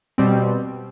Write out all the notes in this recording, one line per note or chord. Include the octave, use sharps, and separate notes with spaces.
B2 G3 C4